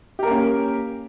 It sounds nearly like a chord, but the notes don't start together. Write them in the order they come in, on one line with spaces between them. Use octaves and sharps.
G4 A#4 A#3 C#4